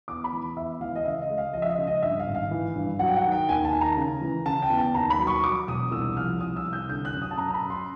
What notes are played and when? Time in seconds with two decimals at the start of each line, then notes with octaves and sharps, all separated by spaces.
0.08 E2 D6
0.24 B5
0.33 E3
0.56 E2 E5
0.81 E3 F5
0.96 D#5
1.05 C#3 E5
1.21 D#5
1.30 G#3
1.38 F5
1.53 F3 D#5
1.62 E5
1.70 D#5
1.78 C#3
1.87 D#5
2.03 G2 E5
2.19 F5
2.27 G#1
2.35 F5
2.51 E3
2.76 G2
2.99 F#3 F#5
3.08 G5
3.17 F#5
3.24 D#3
3.32 G5
3.49 D#2 G#5
3.65 A5
3.72 D#3
3.81 A#5
3.97 C#3
4.21 E3
4.46 C#3 A5
4.62 G5
4.70 E2
4.78 A5
4.94 D#2 A#5
5.10 B5
5.19 F#3
5.27 C#6
5.44 F#3 D6
5.68 E1 D#6
5.91 C2 E6
6.17 F3 F6
6.40 C2 D#6
6.56 E6
6.66 C2
6.73 G6
6.89 D3 G6
7.05 F#6
7.13 F#2
7.22 D#6
7.31 A5
7.38 F#2 A#5
7.49 A#5
7.54 B5
7.62 F#2
7.70 C6